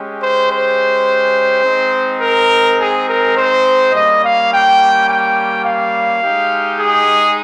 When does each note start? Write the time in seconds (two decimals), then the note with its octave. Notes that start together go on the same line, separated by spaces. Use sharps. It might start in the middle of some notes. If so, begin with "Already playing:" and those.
Already playing: G#3 C#4 G4
0.20 C5
0.50 C5
1.63 G#3 C4 D#4
2.21 A#4
2.79 G#4
3.07 A#4
3.36 C5
3.92 G3 A#3 C#4 D#5
4.22 F5
4.51 G5
5.07 G5
5.65 F5
6.22 G#3 D#4 G4
6.79 G#4